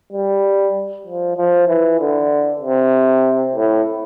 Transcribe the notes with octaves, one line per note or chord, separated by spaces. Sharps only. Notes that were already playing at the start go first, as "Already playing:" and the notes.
G3
F3
F3
E3
D3
C3
A2